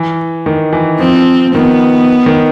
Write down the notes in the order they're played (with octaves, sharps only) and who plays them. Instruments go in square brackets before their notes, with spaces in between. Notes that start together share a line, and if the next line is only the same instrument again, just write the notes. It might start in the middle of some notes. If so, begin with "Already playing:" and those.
Already playing: [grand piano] E3
D#3
E3
[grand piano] F3 [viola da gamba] C4
[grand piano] D#3 [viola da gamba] B3
[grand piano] D#3